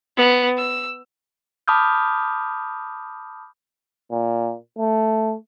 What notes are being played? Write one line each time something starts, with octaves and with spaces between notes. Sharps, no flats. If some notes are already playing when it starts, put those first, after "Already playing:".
B3
E6
A5 B5 D6 D#6 F6 G6
A#2
A3